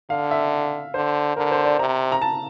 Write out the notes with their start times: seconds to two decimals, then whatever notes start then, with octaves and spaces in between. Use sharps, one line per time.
0.10 D3 F5
0.31 E5
0.94 D3 C5
1.37 D3 A#4
1.51 C5
1.65 D5
1.79 C3 A#5
2.12 A#5
2.22 A5